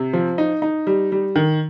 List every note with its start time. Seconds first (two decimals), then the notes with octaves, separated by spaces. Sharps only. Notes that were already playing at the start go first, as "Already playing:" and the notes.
Already playing: C3
0.13 F3
0.38 D#4
0.62 D#4
0.87 G3
1.12 G3
1.36 D#3